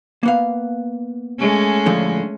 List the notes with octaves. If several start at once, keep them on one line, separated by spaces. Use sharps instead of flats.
A#3 B3 F5
G#3 A3 C#4
A2 D3 F3